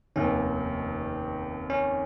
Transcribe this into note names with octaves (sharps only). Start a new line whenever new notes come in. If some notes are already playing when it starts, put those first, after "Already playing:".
F1 D#2 D#3 C#4
C#4